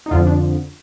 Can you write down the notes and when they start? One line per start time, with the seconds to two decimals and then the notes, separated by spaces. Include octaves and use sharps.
0.06 D#4
0.11 F2 D3 F3 F4
0.26 D4